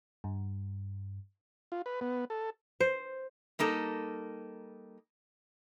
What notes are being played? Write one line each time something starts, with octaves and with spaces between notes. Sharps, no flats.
G2
F4
B4
B3
A4
C5
G3 A#3 D#4 A4